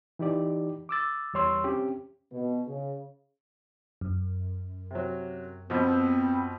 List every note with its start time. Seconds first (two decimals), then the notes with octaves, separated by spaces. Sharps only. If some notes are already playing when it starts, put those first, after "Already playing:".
0.19 E3 D#4 G4 D5
0.89 D6 E6 A6
1.33 E2 G3 C#5 C6 E6
1.64 C4 C#4 G4
2.32 B2
2.67 C#3
4.01 F#2
4.91 C3 F#3
5.70 B2 F3 B3 C4